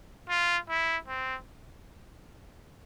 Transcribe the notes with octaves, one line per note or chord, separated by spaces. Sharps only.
F4
E4
C4